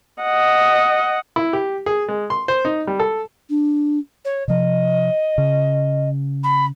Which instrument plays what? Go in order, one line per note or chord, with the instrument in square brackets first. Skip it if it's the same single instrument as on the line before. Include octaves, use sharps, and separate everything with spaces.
[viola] D#5 F#5
[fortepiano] E4
G4
G#4
G#3
C6
C5
D#4
G3
A4
[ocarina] D4
C#5
[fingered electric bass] C3 F3 [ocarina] D#5
[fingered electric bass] C#3
[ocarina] B5